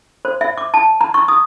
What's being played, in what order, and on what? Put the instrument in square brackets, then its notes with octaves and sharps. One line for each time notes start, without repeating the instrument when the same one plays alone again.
[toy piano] C5
E5
D6
A5
A#5
C#6
D#6